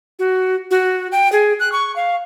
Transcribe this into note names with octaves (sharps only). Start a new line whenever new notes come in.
F#4
F#4
G5
G#4
F#6
C#6
F5